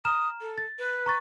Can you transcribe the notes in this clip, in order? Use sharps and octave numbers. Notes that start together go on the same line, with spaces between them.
A#5 D#6 F6 E7
A4
A6
B4
A#5 C#6 A6